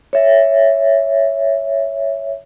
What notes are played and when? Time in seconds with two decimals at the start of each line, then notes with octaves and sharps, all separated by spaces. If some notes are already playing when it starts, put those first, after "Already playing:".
0.13 C#5 E5